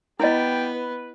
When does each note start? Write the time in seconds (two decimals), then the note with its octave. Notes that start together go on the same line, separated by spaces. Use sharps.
0.20 G3 B3 E4 G4 D#5 G5
0.74 B4